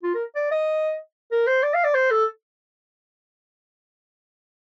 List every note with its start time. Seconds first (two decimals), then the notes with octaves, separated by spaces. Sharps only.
0.03 F4
0.14 A#4
0.35 D5
0.51 D#5
1.31 A#4
1.47 C5
1.63 D5
1.74 F5
1.84 D5
1.94 C5
2.11 A4